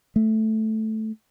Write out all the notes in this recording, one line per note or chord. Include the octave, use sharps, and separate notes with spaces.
A3